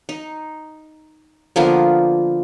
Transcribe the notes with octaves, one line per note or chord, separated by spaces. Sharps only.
D#4
D3 F3 A#3 B3